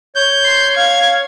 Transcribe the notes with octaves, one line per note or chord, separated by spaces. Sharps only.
C#5 G6
C6
F5 G#6